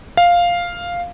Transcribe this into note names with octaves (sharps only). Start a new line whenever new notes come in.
F5